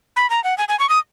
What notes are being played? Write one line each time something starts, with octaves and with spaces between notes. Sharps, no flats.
B5
A#5
F#5
G#5
G#5
C#6
D#6